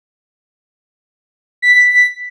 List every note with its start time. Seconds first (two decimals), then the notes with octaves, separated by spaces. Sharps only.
1.62 B6